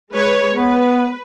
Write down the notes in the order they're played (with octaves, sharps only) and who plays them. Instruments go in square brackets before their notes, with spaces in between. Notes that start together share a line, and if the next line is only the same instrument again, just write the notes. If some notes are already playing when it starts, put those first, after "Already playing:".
[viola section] G#3 B4 C#5
[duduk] B3 [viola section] B4